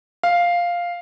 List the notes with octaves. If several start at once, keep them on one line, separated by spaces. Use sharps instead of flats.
F5